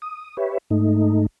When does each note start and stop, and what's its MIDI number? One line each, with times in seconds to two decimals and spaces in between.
0.02 0.37 87
0.37 0.58 67
0.37 0.58 71
0.37 0.58 73
0.37 0.58 76
0.70 1.26 44
0.70 1.26 57
0.70 1.26 63